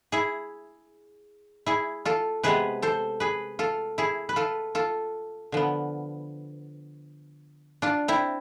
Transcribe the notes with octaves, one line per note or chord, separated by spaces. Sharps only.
E4 G#4
E4 G#4
F4 A4
C3 G#3 B3 G#4 B4
A4 C5
G#4 B4
F4 A4
E4 G#4
B4
F4 A4
F4 A4
D3 F3 B3
D4 F4
C4 E4